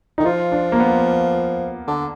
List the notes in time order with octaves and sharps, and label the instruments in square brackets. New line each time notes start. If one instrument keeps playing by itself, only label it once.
[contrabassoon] D#3 [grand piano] D#4
[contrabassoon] F3 [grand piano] F4
[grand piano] D4
A#3
B3
[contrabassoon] D3